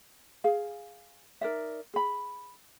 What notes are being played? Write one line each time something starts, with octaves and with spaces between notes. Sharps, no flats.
G#4 F5
D#4 A#4 D5 E5
G#4 B5